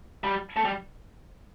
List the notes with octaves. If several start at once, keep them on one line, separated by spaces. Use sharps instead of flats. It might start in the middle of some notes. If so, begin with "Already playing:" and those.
G3
A3
G3